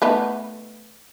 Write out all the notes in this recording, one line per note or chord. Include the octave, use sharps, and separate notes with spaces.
A3 B3 D#4